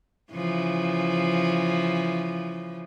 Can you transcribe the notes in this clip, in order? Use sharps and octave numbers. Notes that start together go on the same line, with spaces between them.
C#3 E3 F3